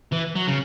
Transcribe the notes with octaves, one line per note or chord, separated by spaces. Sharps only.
E3
F#3
C#3